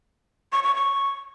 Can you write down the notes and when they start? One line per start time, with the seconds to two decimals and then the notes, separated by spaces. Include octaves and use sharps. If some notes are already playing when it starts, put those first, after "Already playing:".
0.52 C#6
0.64 C#6
0.75 C#6